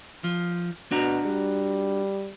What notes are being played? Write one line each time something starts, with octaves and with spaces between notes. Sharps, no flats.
F3
B2 D4 F#4 A#5
G3